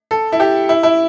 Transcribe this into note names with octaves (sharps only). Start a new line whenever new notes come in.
A4
E4
G4
E4
E4